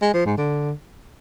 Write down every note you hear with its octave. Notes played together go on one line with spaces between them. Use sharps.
G#3
F3
G#2
D3